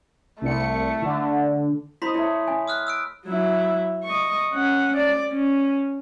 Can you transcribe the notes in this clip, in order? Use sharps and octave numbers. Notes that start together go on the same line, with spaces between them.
C2 A3 C#7
D3
E4 C5 D#5 B5 C6 B6
A3 E4 C#5
G#5
D#6 F6 F#6
E6 F#6 D7
F#3 E4
D#5 C#6
C#4 F#5
D5
C#4